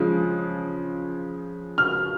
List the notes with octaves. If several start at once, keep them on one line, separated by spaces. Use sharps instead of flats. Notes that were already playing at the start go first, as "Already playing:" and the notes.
Already playing: C#3 F3 G#3
F6